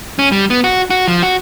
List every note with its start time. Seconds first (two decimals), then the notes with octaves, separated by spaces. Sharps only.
0.19 C#4
0.32 G3
0.50 B3
0.64 F#4
0.90 F#4
1.08 F3
1.23 F#4